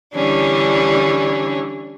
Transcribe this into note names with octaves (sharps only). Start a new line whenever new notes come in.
D3 E3 G3 C#4 D4